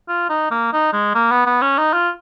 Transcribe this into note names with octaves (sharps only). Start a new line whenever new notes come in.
F4
D#4
A#3
D#4
G#3
A#3
B3
B3
C#4
D#4
F4